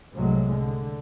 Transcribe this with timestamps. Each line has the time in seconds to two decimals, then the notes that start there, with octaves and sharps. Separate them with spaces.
0.15 C2 A2 F#3 G#3 A3
0.53 D3